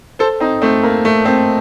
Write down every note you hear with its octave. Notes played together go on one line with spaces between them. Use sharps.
A4 C5
C4 D#4
A3 C4
A#3
A3
A3 C4